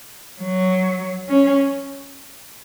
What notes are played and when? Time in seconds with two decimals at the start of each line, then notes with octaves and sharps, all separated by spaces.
0.41 F#3
1.29 C#4